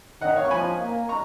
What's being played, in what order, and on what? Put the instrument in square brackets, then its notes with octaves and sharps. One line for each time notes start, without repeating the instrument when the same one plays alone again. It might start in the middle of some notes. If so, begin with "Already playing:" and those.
[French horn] D#3 [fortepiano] D#5 F#5
[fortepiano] C#5 F5
C#6
[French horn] F3 [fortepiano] G#5 B5
[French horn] A#3
[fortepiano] A#5 C#6